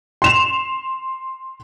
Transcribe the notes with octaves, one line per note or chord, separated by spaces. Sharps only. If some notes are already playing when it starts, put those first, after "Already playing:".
C6 E7 F7